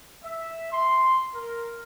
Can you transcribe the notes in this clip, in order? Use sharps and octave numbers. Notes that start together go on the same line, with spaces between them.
E5
C6
A#4